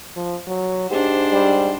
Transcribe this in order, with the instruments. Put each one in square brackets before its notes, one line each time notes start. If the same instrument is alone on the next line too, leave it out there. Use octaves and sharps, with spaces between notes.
[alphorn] F3
F#3
[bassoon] G#2 [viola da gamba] D4 C5 [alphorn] G4
[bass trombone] G3